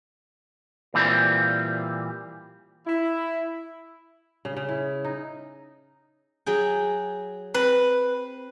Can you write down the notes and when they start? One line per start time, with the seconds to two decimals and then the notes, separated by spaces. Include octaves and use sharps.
0.94 A#2 E3 G3 C4
2.87 E4
4.45 C#3
4.57 C#3
4.69 E4
5.04 D#4
6.46 F#3 G#4 G5
7.55 C4 B4